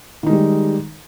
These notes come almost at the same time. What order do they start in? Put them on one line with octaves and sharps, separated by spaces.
D#3 D#4 G#3 G3